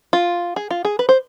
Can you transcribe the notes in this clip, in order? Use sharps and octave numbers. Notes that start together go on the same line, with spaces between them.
F4
G#4
F4
G#4
B4
C5